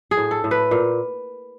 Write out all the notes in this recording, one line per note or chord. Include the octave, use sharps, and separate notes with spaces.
G#4
A2
A4
A2
B4
A#2